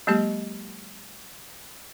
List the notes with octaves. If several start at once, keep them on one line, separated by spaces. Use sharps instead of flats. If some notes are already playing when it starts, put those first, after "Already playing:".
F#3 G#3 A#3 G4 D#5